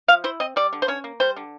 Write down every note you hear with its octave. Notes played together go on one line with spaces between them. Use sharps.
F3 F5
E4 C5
C4 D#5
G3 D5
D3
C5
C#4 C#5
A#3
G3 C5
D3